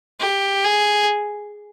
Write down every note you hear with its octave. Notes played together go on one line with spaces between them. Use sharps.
G4
G#4